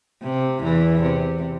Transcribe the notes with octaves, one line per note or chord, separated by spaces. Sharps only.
C3
E2 E3
C3